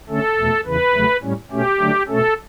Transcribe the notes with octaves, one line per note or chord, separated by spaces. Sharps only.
D3 A3 C#4 A4
E2 B2 A3
E2 C#3 E3 B4
E2 C#3 F#3 A3
A2 G3 C#4
B2 A3 C#4 G4
D3 F#3 A3 D4
B2 A3 C#4 A4